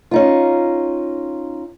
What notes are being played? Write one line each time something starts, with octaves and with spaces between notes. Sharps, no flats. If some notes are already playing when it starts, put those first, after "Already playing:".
C#4 D#4 F4